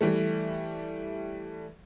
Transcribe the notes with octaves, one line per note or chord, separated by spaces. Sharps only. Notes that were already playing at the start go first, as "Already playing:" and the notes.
E3 G3 A3